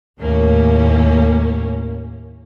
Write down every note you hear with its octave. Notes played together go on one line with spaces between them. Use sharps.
D#2 A2 A#3 C#4